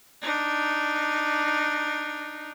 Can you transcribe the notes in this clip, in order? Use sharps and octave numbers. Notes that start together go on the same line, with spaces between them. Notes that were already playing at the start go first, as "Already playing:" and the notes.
D4 D#4